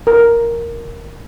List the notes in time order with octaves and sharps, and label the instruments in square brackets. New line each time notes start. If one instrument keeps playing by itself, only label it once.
[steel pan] A#4